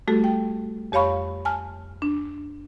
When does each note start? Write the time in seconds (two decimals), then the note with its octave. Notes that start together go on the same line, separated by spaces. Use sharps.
0.08 G3 A3 F#4 G4 A4
0.24 G5
0.92 F2 G4 C#5 F5 B5 C#6
1.45 G#5 A5 F6
2.02 D4